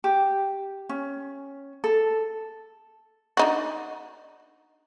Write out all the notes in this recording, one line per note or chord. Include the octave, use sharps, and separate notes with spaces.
G4
C#4
A4
D4 D#4 F#4